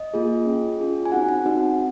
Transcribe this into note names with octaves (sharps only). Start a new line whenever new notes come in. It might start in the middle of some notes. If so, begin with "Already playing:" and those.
Already playing: D#5
A#3 F4 G#4
C#4 F4 G#4
C#4 F4 G#4
G#5
C4 D#4 F#4 F#5
F#5
C4 D#4 F#4